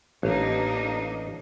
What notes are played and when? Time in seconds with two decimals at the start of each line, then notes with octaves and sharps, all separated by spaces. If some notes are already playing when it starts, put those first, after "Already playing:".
0.23 A1 A#3 D4 D#4